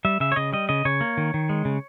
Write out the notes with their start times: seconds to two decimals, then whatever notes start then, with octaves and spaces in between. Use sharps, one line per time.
0.05 G3 E5
0.20 C#3 E5
0.32 C#5
0.36 C#3 D#5
0.53 G3 D#5
0.69 C#3 D#5
0.85 C#3 C#5
1.01 A#3
1.17 D#3
1.34 D#3
1.49 G#3
1.65 C#3